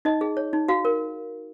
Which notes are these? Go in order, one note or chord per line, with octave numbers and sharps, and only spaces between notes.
D#4 D#5
G#4
C#5
D#4
F#4 F5
A#4